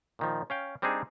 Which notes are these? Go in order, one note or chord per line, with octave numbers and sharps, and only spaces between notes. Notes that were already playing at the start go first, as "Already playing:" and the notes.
A#2 D#3 F3
C#4 F5 G5
G3 C4 D4 D#4 G#4